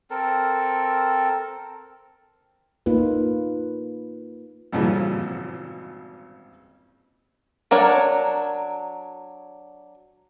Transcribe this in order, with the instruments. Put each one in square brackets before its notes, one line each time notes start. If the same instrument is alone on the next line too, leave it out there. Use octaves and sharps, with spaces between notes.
[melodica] C4 A4 A#4
[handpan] A#3 D#4 F4 B4
[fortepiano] G#1 G2 A#2 C#3 E3 F3
[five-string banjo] F#3 D4 A#4 C#5